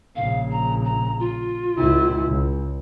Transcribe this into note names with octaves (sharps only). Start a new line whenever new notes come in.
A#1 C#3 F5
A#5
A#5
F4
C#2 E4
C#2